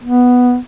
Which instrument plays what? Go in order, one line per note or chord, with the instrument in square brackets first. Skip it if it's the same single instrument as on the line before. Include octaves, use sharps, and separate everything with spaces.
[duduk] B3